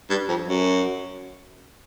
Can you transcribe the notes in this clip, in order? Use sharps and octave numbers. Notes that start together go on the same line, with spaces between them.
G2
F2
F#2